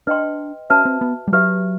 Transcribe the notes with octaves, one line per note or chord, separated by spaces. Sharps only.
D4 B4 D#5 G5 C6
C#4 F#4 B4 E5 A5
C4
B3
G3
F#3 G4 B4 E5